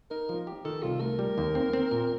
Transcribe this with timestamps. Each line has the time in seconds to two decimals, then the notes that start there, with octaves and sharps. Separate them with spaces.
0.11 D#4 A#4
0.29 F3
0.47 G4
0.65 D#3 A4
0.82 C2 F4
1.01 A3 A#4
1.19 G3
1.38 D#2
1.55 C4
1.73 C4
1.91 A#2